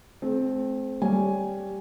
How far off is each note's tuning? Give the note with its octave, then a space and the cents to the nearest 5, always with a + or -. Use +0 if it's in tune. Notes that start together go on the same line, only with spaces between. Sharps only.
A3 -40 C4 +0
G3 +0 C#5 +0 G#5 +0